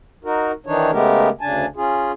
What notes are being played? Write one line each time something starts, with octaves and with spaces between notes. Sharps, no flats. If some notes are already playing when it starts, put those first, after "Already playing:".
D#4 F#4 A#4
D#3 E3 D4 D#4 C#5
C#3 G#3 A3 B3 G4 A#4
D2 C#3 D4 G#5 A5
C#4 F4 G#4